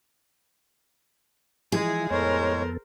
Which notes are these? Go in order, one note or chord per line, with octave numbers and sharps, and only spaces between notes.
E3 F3 G#3 E4 G#4 G#5
F2 A2 G#3 B3 A4 A#4 C5 C#5